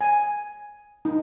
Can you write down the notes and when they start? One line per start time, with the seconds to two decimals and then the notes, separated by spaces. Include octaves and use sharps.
0.01 G#5
1.05 D#4